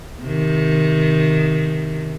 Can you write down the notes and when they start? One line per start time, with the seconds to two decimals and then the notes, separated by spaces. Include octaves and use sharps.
0.23 C3 D#3